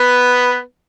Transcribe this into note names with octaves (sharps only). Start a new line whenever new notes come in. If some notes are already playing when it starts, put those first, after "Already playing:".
Already playing: B3 B4